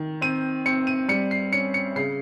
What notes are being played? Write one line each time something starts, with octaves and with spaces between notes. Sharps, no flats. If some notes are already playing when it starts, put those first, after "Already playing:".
Already playing: D#3
C4 D#7
C4 C#7
D#7
G3 C#7
C7
C#4 C#7
C#7
C#3 C7